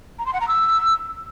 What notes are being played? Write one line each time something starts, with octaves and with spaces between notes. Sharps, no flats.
A#5
C6
F#5
A#5
E6